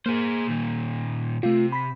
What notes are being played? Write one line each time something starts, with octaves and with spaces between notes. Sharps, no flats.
A#3 G#4 C5
A#2 D#3
C3 A3 F4
B5 B6